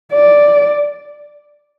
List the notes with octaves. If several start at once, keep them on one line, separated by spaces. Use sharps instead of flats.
D5